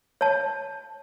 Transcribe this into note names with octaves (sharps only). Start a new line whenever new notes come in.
C#5 A5